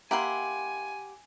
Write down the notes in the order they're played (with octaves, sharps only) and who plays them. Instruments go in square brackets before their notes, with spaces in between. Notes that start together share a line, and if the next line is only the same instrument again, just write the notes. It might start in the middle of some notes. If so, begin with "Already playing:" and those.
[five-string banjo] A#3 E4 B5 [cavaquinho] G4 F#5 C6 [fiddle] G#5